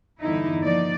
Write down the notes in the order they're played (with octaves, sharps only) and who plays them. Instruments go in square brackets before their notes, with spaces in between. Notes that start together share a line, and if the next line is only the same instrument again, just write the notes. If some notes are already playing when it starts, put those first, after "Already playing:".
[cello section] E2 G2 D3 D#4 E4
F3 A#3 D#4 D5